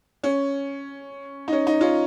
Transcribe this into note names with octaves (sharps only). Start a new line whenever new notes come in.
C#4
D#4
C#4
D#4
C#4 F4